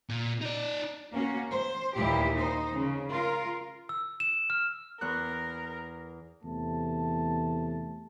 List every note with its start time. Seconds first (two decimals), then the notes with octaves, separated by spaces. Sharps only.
0.09 A#2
0.42 D#4 D5
1.12 A#3 C#4 F#4
1.51 C5
1.95 D#2 A#2 E3 E4 G4
2.37 D#4 C5
2.74 C#3
3.10 F4 A#4
3.89 E6
4.20 E7
4.50 F6
5.01 E2 A#4 C#6 F#6
6.43 E2 C3 A3 A5